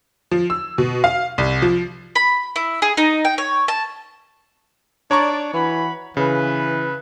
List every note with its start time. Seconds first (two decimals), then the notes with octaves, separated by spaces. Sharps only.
0.31 F3
0.50 E6
0.78 B2
1.04 F5
1.38 C2
1.62 F3
2.15 B5
2.56 E4
2.82 G#4
2.97 D#4
3.25 G5
3.38 C#5
3.68 A5
5.11 D4 D#4 A#4 C#5 D5 A#5 C#6
5.54 E3 F#4 F#5 B5
6.17 C#3 E3 B4